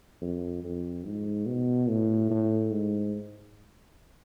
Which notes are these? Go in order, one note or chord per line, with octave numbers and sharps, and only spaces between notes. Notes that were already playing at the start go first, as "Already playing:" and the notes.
F2
F2
G#2
B2
A2
A2
G#2